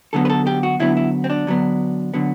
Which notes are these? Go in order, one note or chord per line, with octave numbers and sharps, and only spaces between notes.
D3 F#3 B3 A4
B4
A4
G4
F#4
D3 F#3 B3 E4
E4
C4
D4
D3 F#3 B3
D3 F#3 B3